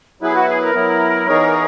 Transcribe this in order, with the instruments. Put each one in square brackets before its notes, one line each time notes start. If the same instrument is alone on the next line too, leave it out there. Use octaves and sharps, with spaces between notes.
[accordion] F#3 B3 E4 B4 [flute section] G#4
[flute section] F#4
G#4
A#4
[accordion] F#3 B3 E4
E3 B3 D#4 G#4 C#5